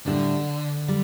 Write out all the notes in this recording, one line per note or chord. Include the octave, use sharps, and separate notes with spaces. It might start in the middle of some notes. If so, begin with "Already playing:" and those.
A2 D3 G3 D4
G3